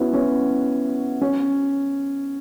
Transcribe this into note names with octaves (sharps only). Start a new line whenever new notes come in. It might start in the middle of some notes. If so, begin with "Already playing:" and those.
Already playing: B3 C#4 E4 F#4
C#4
C#4